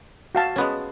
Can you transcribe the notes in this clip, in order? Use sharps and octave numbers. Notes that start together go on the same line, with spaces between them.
F#4 F5 A5
G#3 B3 C#4